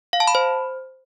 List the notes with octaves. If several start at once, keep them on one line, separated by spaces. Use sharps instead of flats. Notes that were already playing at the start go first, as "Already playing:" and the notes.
F5
A5
B5
C5